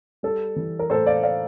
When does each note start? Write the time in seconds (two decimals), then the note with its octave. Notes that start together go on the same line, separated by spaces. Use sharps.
0.23 G3 A4
0.56 E3
0.79 A#4
0.90 A2 A4 C5
1.06 D5 F5
1.23 D5 F5